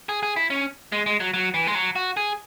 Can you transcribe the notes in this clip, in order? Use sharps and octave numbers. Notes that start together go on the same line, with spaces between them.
G#4
G#4
E4
C#4
G#3
G#3
F#3
F#3
E3
G#3
F#3
F#4
G#4